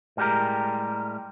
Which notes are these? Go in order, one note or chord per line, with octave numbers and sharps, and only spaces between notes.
A2 G3 G#3 F#4 G4 A#4